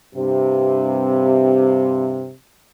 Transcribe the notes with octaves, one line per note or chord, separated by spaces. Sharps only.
G2 C3